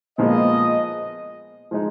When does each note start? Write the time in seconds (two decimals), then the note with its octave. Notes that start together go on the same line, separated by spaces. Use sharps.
0.18 A#2 F3 G#3 B3 F4 D#5
1.71 F3 G#3 D#4